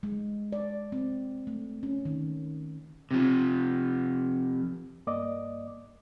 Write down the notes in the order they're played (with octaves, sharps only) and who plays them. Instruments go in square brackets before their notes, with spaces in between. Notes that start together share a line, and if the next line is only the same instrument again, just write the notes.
[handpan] G#3
D5
C4
A3
C#4
D#3
[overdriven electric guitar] C3 F3
[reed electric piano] G2 A#3 D5 D#5 D6